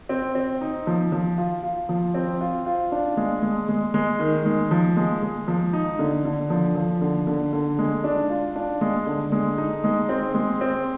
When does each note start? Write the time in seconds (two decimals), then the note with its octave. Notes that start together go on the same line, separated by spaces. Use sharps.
0.09 C4
0.35 C4
0.61 D#4
0.87 F3
1.12 F3
1.38 F4
1.63 F4
1.89 F3
2.14 C4
2.41 F4
2.66 F4
2.92 D4
3.17 G#3
3.42 G#3
3.69 G#3
3.94 G#3
4.20 D#3
4.45 G#3
4.71 F3
4.97 G#3
5.23 G#3
5.48 F3
5.73 D#4
5.99 D3
6.25 D3
6.50 F3
6.75 F3
7.01 D3
7.27 D3
7.53 D3
7.79 G#3
8.04 D4
8.30 F4
8.56 D4
8.81 G#3
9.07 D3
9.32 G#3
9.58 D#4
9.84 G#3
10.09 C4
10.34 G#3
10.61 C4